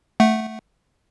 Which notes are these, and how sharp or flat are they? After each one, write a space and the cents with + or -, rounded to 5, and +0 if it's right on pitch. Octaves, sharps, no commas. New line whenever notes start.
A3 +0 F#5 +0